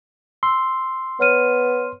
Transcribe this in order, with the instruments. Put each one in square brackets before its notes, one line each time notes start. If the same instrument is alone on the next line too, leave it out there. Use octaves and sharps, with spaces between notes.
[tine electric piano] C6 [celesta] E6
[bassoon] B3 [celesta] C#5 F6 D#7